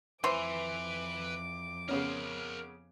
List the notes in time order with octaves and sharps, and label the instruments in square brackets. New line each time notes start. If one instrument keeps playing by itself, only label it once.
[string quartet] F2 D6 [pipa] E3 [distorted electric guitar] B4 G#5 [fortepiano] C5 C6
[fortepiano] C#3 B3 C#4 [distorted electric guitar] A#4 C5